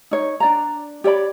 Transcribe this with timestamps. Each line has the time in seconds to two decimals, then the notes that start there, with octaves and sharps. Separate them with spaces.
0.11 D#4 C#5
0.40 D4 D5 A#5
1.04 G4 C#5 D5 B5